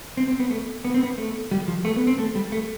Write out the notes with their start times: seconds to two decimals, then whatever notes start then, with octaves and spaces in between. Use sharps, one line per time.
0.17 C4
0.28 C4
0.39 B3
0.51 A3
0.85 B3
0.94 C4
1.03 B3
1.18 A3
1.51 G3
1.68 F3
1.85 A3
1.96 B3
2.07 C4
2.18 A3
2.35 G3
2.52 A3